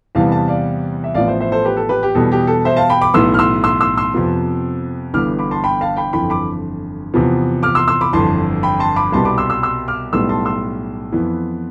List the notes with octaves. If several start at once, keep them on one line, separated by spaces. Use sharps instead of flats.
E2 C3 E3 G3 B3 F5 A5
F5 A5
D5 F5
E5
A1 A2 F3 B3 D5 F5
C5 E5
C5 E5
A4 C5
G4 B4
A4
G4 B4
G4
E2 B2 G3 B3 A4
G4
A4
C5 E5
F5 A5
G5 B5
B5 D6
B1 A2 E3 B3 C6 E6
F6
C6 E6
C6 E6
C6 E6
C6 E6
F2 C3 F3 B3
G1 G2 E3 B3 D6 F6
B5 D6
A5 C6
G5 B5
F5 A5
G5 B5
G1 F2 E3 G5 B5
B5 D6
E2 C3 F3 B3
D6 F6
C6 E6
C6 E6
B5 D6
G1 F2 E3 A5 C6
G5 B5
A5 C6
B5 D6
C2 B2 G3 B3 A5 C6
B5 D6
C6 E6
C6 E6
C6 E6
D6 F6
B1 A2 G3 B3 C6 E6
A5 C6
C6 E6
F2 E3 B3